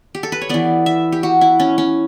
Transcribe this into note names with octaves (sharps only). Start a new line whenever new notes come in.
G4
A4
B4
C#5
E3 B3 D5
E5
G4
F#4
E4
C#4
C#4